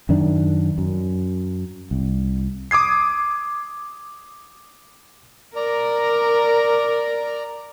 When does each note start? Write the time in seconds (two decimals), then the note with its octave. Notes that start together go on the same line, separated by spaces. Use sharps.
0.09 F#2 D#3 D4
0.78 F#2
1.91 C2
2.71 D6 D#6 G#6 C7
5.56 A#4 D5 A#5